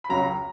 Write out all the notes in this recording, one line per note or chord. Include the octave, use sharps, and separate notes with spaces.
B5
C#2 C#3 F#3 A#5